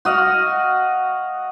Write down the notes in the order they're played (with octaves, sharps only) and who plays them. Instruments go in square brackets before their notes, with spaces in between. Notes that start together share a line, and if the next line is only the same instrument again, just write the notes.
[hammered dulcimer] F#4 D#5 F5